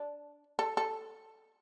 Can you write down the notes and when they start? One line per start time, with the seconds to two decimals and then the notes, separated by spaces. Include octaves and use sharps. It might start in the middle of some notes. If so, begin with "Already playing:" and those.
Already playing: D4
0.59 A4
0.77 A4